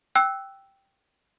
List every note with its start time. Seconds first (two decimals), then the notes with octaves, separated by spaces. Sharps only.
0.15 G5 E6 F#6